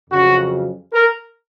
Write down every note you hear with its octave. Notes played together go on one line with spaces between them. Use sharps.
F2 C#3 F#3 F#4
A#4